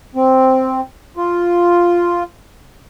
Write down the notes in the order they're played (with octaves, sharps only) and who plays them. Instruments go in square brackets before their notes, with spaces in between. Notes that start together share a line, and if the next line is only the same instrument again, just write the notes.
[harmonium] C4
F4